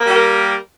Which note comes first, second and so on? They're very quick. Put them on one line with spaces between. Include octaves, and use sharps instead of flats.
A#3 G3 G4 A#4